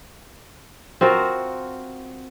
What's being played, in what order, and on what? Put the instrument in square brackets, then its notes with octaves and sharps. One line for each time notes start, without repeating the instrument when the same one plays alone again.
[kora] C4 F4 F#4 A#4